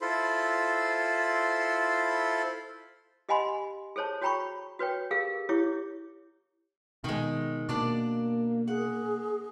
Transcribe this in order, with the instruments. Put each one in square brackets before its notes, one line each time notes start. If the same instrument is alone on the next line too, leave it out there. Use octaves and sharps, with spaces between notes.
[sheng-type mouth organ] E4 F4 A4 C5 B5 C6
[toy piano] G4 D#5 F#5 G#5 B5 C6
G#4 A4 C5 C#5 A5
F#4 C#5 G5 A#5 B5 C#6
F#4 B4 C#5 G5
G4 G#4 A#4 F5
E4 G4 C#5 D6
[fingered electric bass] B2 [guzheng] D#3 G#3
[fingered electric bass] B2 [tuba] A#3 [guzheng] D4 D5
[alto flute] G#4 [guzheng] F#5